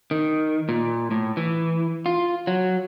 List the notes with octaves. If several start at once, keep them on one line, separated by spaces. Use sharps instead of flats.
D#3
A#2
A2
E3
F4
F#3